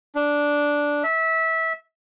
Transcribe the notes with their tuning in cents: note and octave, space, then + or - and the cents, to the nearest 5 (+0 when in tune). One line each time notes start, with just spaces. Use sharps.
D4 -5
E5 -20